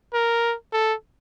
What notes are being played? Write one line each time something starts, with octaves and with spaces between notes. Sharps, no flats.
A#4
A4